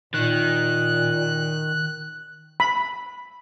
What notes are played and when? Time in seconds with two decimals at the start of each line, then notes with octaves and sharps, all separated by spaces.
0.14 A#2 D#3 F#6
2.60 B5